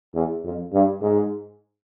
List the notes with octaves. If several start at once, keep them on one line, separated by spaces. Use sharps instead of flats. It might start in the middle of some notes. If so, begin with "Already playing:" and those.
E2
F2
G2
G#2